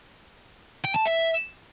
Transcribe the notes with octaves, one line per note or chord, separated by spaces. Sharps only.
G5
A5
E5